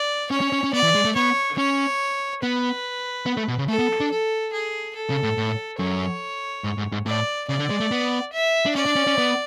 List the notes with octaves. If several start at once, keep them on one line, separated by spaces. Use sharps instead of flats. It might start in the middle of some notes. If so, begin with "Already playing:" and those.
Already playing: D5
C#4 C#5
C#4
C#4
C#4
B3 D5
E3
G#3
A3
B3 C#5
C#4 C#5
B3 B4
B3
A3
B2
C#3
A3 A4
B3
D4
A4
G#4
A4
C#3
A2
A2
F#2 C#5
G#2
G#2
G#2
A2 D5
C#3 D5
D3
G#3
A3
B3
E5
D4
C#4 D5
D4
C#4
C#4
B3